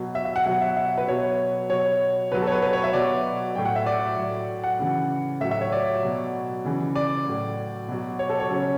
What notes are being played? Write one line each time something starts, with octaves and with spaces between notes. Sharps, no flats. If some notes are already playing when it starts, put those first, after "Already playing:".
Already playing: B2 F#3
E5
E5
F#5
B2 F#3 F#5
E5
E5
B4
B2 F#3 C#5
B2 F#3 C#5
B2 F#3 B4
A4
C#5
B4
B4
C#5
E5
B2 F#3 D5
A2 F#3 G5
F#5
E5
D5
A2 F#3
F#5
C#3 E3
A2 F#3 E5
E5
C#5
D5
B2 F#3
C#3 E3
D5
A2 F#3
B2 F#3
C#5
A4
C#5
C#3 F#3